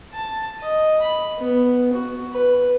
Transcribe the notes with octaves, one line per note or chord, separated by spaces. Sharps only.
A5
D#5
B5
B3
F#4
B4